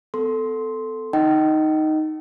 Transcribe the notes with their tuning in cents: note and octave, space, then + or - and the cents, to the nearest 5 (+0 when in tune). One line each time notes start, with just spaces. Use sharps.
B3 +35 A4 +0 C6 +0
D#4 +0 D#5 +0 G5 -40